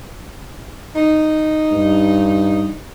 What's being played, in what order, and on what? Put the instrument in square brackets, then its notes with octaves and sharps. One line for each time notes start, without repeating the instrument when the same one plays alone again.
[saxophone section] D#4
[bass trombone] G2